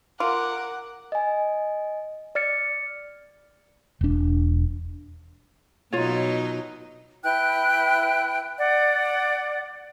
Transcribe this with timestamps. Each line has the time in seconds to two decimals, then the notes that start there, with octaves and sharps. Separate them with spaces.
0.20 F4 A#4 F#5 D6
1.12 D#5 G#5
2.35 D5 F6 A6 C#7
4.01 E1 D4
5.93 B2 F#3 D#4 F4 C#5
7.24 E4 B4 G5 F#6
8.59 D5 F#5